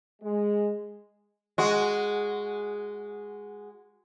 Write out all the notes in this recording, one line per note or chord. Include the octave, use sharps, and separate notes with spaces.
G#3
G#3 F#4